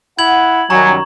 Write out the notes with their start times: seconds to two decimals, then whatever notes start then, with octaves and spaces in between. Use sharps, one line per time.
0.19 E4 F#5 G#6 F#7
0.70 F#2 D#3 F#3 G3 G#5 A#5 C#6